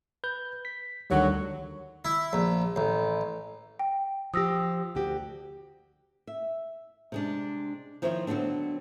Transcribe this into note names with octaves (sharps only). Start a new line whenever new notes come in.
B4 G6
B6
D2 D3 D#3 F#3 G3
E4
A#1
A1
G5
F3 G4 D#6 E6 A#6
D2 F#4 G4
E5
C3 G#3 D4
D#3 F3 C4 E4 C5 C#5
D3 F#3 B3 C4 D4